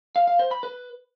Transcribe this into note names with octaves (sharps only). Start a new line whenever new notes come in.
F5
F5
C5
B5
B4